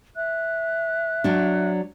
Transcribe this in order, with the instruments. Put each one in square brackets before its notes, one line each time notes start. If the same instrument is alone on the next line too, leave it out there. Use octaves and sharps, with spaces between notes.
[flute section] E5 F#6
[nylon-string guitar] F#3 D4